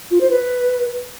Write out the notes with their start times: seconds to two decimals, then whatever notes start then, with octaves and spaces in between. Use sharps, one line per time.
0.11 F4
0.21 C5
0.31 B4